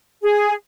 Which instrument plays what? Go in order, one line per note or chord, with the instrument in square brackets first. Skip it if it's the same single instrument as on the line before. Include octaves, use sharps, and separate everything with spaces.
[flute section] G#4